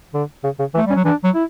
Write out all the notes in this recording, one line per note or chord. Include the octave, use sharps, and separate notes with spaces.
D3
C#3
C#3
E3
A3
G3 C#4
F#3
E3 D4
F#3
E4